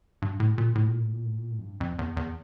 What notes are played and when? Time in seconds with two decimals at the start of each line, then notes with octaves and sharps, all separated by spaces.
0.22 G2
0.40 A2
0.58 A#2
0.75 A2
0.88 A#2
1.00 A2
1.13 A#2
1.25 A2
1.38 A#2
1.51 A2
1.59 F2
1.63 G2
1.80 F2
1.99 E2
2.17 E2